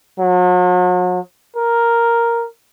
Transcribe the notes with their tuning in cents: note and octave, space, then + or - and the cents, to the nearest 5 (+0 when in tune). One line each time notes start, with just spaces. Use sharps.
F#3 -40
A#4 +0